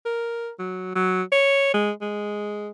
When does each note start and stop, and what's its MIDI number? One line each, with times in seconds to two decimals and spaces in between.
0.06 0.50 70
0.59 0.95 54
0.95 1.22 54
1.32 1.72 73
1.74 1.91 56
2.01 2.71 56